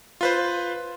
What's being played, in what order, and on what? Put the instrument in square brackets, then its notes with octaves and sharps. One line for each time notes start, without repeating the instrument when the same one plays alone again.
[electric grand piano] F4 B4 C5